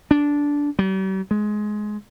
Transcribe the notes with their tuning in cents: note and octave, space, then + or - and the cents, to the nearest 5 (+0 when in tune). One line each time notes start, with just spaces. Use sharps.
D4 -15
G3 -45
G#3 +15